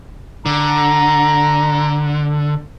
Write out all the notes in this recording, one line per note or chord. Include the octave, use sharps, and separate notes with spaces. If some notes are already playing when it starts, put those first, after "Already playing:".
D3 A#5